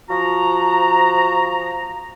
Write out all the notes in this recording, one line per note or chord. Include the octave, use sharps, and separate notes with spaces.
F3 F#4 A#5